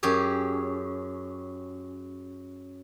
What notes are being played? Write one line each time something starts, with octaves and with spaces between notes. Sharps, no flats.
F#2 C#4 G4 G#4